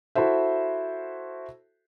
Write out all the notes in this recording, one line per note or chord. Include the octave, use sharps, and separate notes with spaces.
E4 F#4 A4 C5 E5